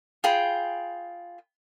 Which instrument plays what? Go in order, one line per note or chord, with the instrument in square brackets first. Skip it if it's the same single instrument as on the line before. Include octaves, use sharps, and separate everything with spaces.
[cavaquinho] F4 G#4 G5 B5